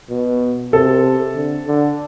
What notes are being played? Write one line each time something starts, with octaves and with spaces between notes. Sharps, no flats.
B2
C3 A4
D3
D3